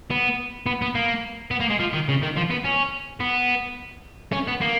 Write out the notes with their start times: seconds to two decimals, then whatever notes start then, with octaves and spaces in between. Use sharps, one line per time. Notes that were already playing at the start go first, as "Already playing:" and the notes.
0.11 B3
0.66 B3
0.82 B3
0.95 A#3
1.51 B3
1.60 A#3
1.70 G#3
1.79 F3
1.93 D#3
2.08 C#3
2.22 D#3
2.36 F3
2.50 B3
2.64 C#4
3.20 B3
4.33 C#4
4.48 B3
4.61 A#3